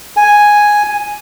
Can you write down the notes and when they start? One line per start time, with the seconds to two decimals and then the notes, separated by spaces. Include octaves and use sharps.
0.17 G#5